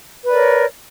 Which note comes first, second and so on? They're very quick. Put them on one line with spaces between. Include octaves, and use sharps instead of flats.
B4 D5 A#4 C#5